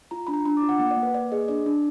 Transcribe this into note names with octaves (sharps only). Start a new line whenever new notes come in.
F4 A#5
D4 B5
A#5
D4 B5
D6
F4
F#5
A#3 F#5
D5
A#3
B4
A#3 D5
G#4 D#5
D4 D5
D4